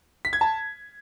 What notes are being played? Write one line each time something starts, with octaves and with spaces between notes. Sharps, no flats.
B6
G#6
A5